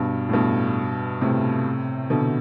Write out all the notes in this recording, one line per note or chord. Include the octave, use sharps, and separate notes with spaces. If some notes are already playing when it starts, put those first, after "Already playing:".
Already playing: G2 B2
A2
G2 B2
A2 C3
B2 D3